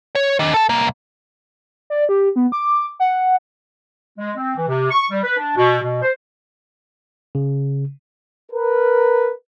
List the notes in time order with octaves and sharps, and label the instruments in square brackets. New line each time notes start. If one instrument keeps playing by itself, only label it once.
[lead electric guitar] C#5
D#3 D4
A4 A5
C2 A#3
[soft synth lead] D5
G4
B3
D6
F#5
[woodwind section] G#3
C4
E3
C3
C#6
G3
B4
D4
B2
B2
C5
[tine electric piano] C#3
[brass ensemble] A#4 B4